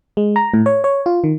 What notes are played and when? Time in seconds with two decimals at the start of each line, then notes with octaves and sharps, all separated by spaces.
0.17 G#3
0.36 A#5
0.54 A2
0.66 C#5
0.84 C#5
1.06 F4
1.24 D#3